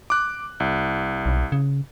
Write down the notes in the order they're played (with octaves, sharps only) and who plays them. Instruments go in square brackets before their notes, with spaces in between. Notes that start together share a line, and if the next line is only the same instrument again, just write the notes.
[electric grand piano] D6 F#6
C2
[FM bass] B1
C#3